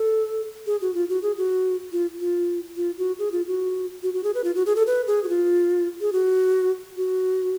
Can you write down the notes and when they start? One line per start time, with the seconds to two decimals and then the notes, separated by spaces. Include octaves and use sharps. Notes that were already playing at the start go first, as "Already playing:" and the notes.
Already playing: A4
0.67 G#4
0.81 F#4
0.94 F4
1.09 F#4
1.22 G#4
1.37 F#4
1.92 F4
2.20 F4
2.76 F4
2.98 F#4
3.19 G#4
3.32 F4
3.47 F#4
4.03 F#4
4.14 F#4
4.24 G#4
4.35 B4
4.44 F4
4.55 F#4
4.66 G#4
4.76 A4
4.87 B4
5.07 G#4
5.24 F#4
5.29 F4
6.01 G#4
6.13 F#4
6.97 F#4